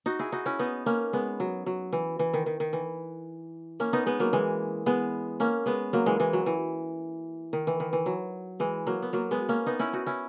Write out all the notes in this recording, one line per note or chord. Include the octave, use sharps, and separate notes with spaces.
D#4 F#4
E4 G#4
D#4 F#4
C#4 E4
B3 D#4
A#3 C#4
G#3 B3
F#3
F#3
E3
E3
D#3
D#3
D#3
E3
A#3 C#4
B3 D#4
G#3 B3
F#3 A#3
E3 G#3
G#3 B3
A#3 C#4
G#3 B3
F#3 A#3
E3 G#3
E3 G#3
F#3
E3
D#3
E3
D#3
E3
F#3
E3 G#3
F#3 A#3
B3
F#3 A#3
G#3 B3
A#3 C#4
B3 D#4
C#4 E4
D#4 F#4
C#4 E4